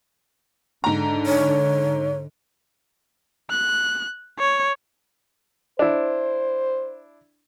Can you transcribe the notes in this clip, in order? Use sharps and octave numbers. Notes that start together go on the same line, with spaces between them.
G#2 D3 A#5
C#5
F#6
C#5
D4 E4 C5